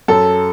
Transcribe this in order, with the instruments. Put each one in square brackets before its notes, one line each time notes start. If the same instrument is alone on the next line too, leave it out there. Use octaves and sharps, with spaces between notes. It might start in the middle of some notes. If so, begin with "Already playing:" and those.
[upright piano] F#2 A4